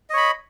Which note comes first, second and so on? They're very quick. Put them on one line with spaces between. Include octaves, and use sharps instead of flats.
D#5 C#5 B5